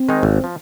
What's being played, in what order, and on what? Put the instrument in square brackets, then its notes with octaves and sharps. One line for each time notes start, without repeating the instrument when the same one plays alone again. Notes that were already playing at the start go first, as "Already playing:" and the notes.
Already playing: [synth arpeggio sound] C4
[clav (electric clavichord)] D#3 G#3 D#4
G#1
F3